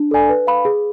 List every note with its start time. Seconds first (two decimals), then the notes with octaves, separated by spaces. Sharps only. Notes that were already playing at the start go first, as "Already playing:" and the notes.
Already playing: D4
0.11 A4 D5 G#5
0.29 B4
0.47 F5 B5
0.65 G#4